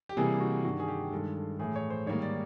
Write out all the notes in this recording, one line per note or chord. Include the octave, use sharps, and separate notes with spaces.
G4
C3 E3 G3 A#3 G#4
F#4
G2 D#3 G3 F#4
G#4
G4
G2 D#3 G#3 A4
A4
A2 E3 A3 G#4
C#5
C5
G#2 D#3 G3 A#3 C#5
D5